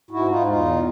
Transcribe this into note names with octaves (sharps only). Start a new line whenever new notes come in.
G#2 E4 F#4
G#2 D#4 F4
E2 D#4 F4
B2